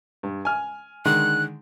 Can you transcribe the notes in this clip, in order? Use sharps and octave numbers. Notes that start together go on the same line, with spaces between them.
G2
G#5 F6
D3 D#3 G#3 F#6